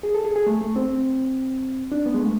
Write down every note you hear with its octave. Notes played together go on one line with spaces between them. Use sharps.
G#4
A4
G#4
G#4
A3
A3
C4
D4
B3
G#3
A3